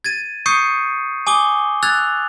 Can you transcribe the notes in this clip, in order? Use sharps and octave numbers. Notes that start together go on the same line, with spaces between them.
G#6 A6 D#7
C#6 D#6 G6 C7 C#7 D#7
G#5 D6 D#6 G7
E6 F#6 G#6 A6 F7